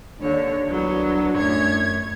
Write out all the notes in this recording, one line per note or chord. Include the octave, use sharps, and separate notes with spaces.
D#2 D3 D4 C#5
C2 F#3 B3
F#2 A2 C#5 G#6